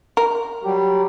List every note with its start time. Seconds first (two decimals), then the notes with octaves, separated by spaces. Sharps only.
0.17 A#4
0.64 F#3 G3 G4